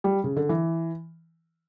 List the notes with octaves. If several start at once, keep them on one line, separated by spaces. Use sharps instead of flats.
G3
C#3
D3
E3